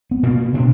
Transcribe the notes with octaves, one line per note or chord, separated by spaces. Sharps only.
B3
B2 A#3
B2 D4